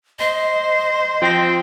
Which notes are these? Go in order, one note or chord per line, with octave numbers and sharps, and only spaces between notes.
C5 D#5
F3 C4 G5 A#6